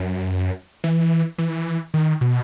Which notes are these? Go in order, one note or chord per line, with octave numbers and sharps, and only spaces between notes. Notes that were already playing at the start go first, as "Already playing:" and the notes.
Already playing: F#2
E3
E3
D#3
B2